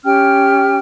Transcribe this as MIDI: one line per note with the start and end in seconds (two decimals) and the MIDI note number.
0.04 0.78 61
0.04 0.78 67
0.04 0.78 79
0.04 0.78 89